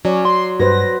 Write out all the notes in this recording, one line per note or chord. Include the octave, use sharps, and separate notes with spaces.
F#3 C#4 D5
C6
G2 F#4 B4 C5 A#6